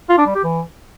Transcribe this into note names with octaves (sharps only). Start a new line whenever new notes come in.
F4
D4
G3
G4
E3